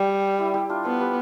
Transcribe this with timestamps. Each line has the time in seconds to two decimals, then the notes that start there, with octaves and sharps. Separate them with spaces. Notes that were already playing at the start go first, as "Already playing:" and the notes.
Already playing: G3
0.39 E4 G4
0.54 E4 G4
0.69 D4 F4
0.85 B3 A4 C5
1.00 G4 B4